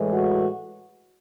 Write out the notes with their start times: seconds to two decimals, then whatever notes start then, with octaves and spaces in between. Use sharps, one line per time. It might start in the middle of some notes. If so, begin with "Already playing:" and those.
Already playing: A2 E3 G#3
0.13 F#4